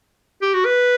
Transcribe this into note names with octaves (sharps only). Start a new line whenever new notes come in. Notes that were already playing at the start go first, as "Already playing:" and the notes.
G4
F#4
B4